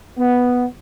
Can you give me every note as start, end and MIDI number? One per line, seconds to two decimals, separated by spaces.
0.18 0.65 59